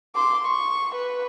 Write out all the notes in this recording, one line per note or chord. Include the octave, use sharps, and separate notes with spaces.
C6 D6
C#6
B4